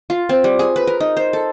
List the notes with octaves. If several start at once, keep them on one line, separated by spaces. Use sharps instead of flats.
F4
C4
G3
G#4
B4
A#4
D#4
C5
A4